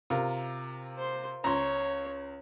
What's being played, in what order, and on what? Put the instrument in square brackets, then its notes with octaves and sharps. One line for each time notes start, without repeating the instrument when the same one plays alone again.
[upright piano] C3 [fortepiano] F4 A#4
[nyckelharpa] C5 C6
[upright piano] C#2 [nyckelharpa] C#5 [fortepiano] A#5 C6